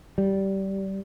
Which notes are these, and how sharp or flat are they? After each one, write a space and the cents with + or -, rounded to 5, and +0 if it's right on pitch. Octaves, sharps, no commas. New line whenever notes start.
G3 -15